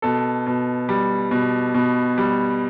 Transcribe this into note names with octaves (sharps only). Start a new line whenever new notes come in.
B2 A4
B2
G3
B2
B2
G3